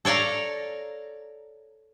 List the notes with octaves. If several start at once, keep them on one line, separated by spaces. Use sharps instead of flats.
A4 C#5 D5 F5 A#5